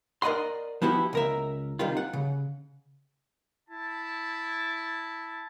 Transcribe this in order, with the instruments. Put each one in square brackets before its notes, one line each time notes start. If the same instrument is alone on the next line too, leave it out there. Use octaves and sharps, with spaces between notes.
[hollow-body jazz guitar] A#4 D5 D#5 F#5 C6
F3 B3 E4 F#4 G4
C#2 A#4 E5
C3 D#3 G3 F4
F#5
C#3
[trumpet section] E4 A5